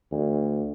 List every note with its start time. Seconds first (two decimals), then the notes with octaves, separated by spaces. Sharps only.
0.11 D2